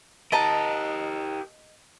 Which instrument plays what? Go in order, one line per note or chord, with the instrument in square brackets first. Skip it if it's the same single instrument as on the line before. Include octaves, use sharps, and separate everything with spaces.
[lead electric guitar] G4 A#4 [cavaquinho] D#5 A5 A#5